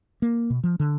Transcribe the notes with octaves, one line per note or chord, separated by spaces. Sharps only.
A#3
B2
F3
D3